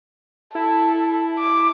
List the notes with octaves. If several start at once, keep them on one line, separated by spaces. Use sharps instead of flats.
E4 A4
D6